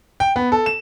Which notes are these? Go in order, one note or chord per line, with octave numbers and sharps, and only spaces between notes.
G5
B3
A4
E7